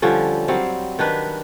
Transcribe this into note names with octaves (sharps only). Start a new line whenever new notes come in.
D3 F3 G3 C#4
F#3 G3 C4 F5
D#3 D4 B4